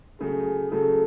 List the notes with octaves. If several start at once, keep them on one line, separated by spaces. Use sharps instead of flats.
C#3 F#3 A3 G#4
C#3 F#3 A3 A4